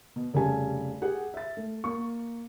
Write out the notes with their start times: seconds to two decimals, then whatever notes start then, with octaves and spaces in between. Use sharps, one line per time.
0.16 B2
0.34 F1 C#3 G3 G#5 A5
1.02 G4 G#4 F#5
1.34 E5 A6
1.57 A3
1.84 A#3 C#6